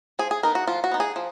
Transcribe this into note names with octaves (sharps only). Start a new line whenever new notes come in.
F3 G#4
G#4
B3 D#4 A#4
F#4
F3 F4
F#4
B3 D#4
G#4
F3